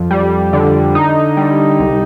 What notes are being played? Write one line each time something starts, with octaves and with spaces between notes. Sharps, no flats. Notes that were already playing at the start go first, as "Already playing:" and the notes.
Already playing: F2
G3
D3
D#4
G3
C2